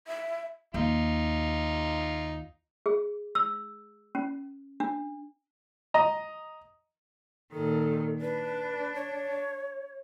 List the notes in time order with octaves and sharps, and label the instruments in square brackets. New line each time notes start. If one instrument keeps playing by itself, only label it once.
[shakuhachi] E5
[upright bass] D#2 [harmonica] D#4 F4
[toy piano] G#4
E6
C#4
D4
[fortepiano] D#5 A#5
[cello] A#2 D#3 [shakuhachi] A4
[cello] D4 [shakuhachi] B4
[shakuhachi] C#5